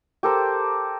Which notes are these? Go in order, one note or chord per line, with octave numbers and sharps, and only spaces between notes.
G4 A4 A#4 C5